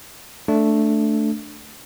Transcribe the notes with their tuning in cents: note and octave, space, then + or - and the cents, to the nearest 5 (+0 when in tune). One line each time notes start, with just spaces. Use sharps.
A3 +0 D4 +0